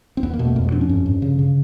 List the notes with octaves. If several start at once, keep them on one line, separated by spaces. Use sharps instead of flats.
C4
E2 B3
A#3
B2
A3
F2 A#3
G#3
F2 D4
C#4
G2
G2
C#3
C#3